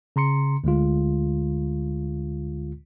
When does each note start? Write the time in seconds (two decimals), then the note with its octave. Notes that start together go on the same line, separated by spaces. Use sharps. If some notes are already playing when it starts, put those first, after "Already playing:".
0.16 C#3 A#5 C6 C#7
0.64 D2 D3 G#3 F4